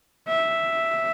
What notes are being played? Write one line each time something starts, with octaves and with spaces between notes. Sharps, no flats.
E5